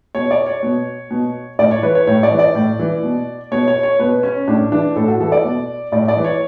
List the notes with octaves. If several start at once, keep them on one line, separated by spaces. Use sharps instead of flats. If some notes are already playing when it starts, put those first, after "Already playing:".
B2 C#5
D5
C#5
B2
B2
A2 D5
C#5
E3 B4
C#5
A2 C#5
D5
E3
D5
A2
E3
B2
B2 C#5
C#5
C#5
B2 B4
C#4
A2 D4
E3 D4
A2 A4
F#4
E3 A4
D5
B2
A2 D5
D5
E3
C#5